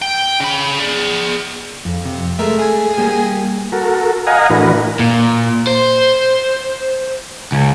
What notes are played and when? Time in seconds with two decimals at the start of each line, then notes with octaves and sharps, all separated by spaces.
0.02 G5
0.40 C#3 B5
0.78 G#4 D5
1.85 F2
2.05 C3
2.39 G#3 A3 A#4 E5
2.59 G#4 G#5
2.98 G3 A#3 G4
3.72 F#4 A4 A#4
4.27 D#5 F5 F#5 G#5 A#5
4.50 A2 E3 D4 F#4 A#4 B4
4.99 A#2
5.67 C5
7.52 C#2